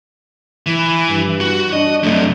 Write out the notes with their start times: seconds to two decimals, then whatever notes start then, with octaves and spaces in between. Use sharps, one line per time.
0.66 E3
1.08 G2
1.41 F#4
1.73 D4 D#5
2.03 F#2 C3 A3